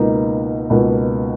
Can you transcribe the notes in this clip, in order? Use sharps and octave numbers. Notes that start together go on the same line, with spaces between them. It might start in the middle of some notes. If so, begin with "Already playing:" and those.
Already playing: C#2 B2 A#3 D#4
C#2 B2 A#3 D#4